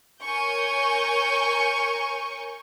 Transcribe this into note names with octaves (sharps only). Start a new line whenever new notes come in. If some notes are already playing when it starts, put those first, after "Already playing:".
A#4 C#5 G#5 C#6 G6